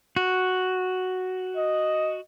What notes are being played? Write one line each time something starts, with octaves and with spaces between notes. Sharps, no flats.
F#4
D#5